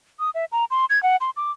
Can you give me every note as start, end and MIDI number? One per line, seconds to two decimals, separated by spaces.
0.19 0.30 87
0.34 0.45 76
0.52 0.65 82
0.71 0.85 84
0.90 1.01 92
1.03 1.16 78
1.21 1.30 84
1.36 1.51 86